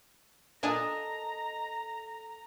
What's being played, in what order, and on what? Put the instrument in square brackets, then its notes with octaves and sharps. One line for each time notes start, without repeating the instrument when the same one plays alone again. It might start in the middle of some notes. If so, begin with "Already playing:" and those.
[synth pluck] A#2 D4 G#5 [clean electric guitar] A4 D#5 [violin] A#5